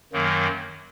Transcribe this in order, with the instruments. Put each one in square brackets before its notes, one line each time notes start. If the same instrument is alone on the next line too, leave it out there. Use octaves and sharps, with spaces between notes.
[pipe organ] F#2 D#3 F#3 A#3